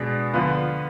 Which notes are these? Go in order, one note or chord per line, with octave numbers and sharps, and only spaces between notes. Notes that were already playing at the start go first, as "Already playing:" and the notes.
Already playing: B2 G#3 D4 G#4
D3 F3 B3 F4 B4